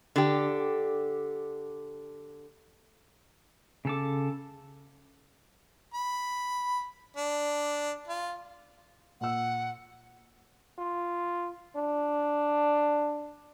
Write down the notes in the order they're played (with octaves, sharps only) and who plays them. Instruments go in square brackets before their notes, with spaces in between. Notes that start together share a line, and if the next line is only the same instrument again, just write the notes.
[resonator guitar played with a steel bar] D3 G4
[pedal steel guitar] C#3 A4 D6
[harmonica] B5
D4
F4
[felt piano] A#2 E6 [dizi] F#5
[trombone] F4
D4